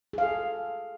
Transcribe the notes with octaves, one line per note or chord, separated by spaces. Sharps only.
G#4 A4 F5